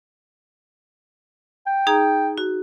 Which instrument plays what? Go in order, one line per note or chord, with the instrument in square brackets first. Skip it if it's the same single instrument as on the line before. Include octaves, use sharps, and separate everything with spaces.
[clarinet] G5
[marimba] D#4 G#4 A#5
F#4